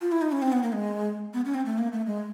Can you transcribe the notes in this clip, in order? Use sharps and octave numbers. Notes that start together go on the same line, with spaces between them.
F4
E4
D#4
C#4
C4
B3
A#3
G#3
B3
C#4
C4
A3
A#3
A3
G#3